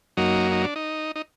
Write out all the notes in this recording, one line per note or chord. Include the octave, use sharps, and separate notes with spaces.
F#2 F#3 A#3 D#4
D#4
D4
D#4
D#4